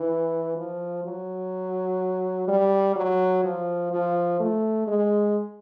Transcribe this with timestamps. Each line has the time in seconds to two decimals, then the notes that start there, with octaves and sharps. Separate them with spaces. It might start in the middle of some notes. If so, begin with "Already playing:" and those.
Already playing: E3
0.57 F3
1.04 F#3
2.48 G3
2.96 F#3
3.44 F3
3.92 F3
4.40 A3
4.87 G#3